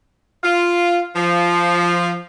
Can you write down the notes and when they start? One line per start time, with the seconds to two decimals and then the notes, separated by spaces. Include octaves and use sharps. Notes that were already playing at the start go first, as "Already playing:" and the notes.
0.44 F4
1.16 F3